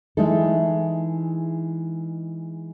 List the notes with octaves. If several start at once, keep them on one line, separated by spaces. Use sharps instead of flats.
E3 G#3 D#4 E4 A4